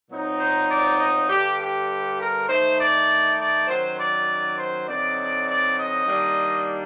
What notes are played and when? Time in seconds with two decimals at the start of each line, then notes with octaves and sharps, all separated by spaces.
0.10 A#2 F#3 C4 D#4
0.40 C5
0.70 D5
1.00 D#5
1.29 G2 D3 G3 G4
1.60 G4
2.19 A#4
2.48 D#3 A3 D#4 C5
2.79 D5
3.39 D5
3.68 F#2 D#3 F#3 C5
3.98 D5
4.57 C5
4.88 D3 F#3 C4 D#4 D5
5.47 D5
5.76 D#5
6.06 D#3 G3 A#3 D4